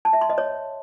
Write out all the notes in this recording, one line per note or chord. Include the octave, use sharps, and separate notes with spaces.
A5
E5
C6
D#5
C#5